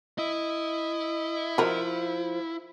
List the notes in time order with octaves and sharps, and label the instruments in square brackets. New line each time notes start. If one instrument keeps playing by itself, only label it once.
[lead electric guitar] E4 [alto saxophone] D#5
[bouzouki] F3 [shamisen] F#4 A#4